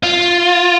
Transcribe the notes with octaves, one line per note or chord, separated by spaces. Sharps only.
F4